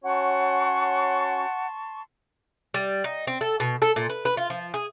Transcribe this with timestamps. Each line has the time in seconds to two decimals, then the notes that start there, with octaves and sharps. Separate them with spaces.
0.04 C#4 F#4 C#5 F#5 A5 C6 C#6
2.74 G3
3.04 D#4
3.27 C4
3.41 A4
3.60 B2
3.82 A4
3.96 A#2
4.09 B4
4.25 B4
4.37 F4
4.50 F3
4.74 G#4